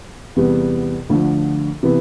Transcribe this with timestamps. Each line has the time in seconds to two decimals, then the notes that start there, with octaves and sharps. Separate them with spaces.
0.36 E2 C3 G3 B3
1.09 D2 D3 F3
1.83 C3 E3 B3 E4